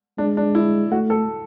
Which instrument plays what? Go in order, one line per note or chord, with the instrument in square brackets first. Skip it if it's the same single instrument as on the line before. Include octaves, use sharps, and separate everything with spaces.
[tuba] G#3 [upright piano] D4
[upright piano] D4
E4
[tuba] A3 [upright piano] F#4
[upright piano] A4